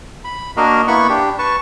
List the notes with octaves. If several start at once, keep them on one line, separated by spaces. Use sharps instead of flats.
B5
A#3 D4 F#4 A#4 D#5 F5
A#3 B3 E4 F#5 B5 C#6
D4 G4
B4 A5 C#6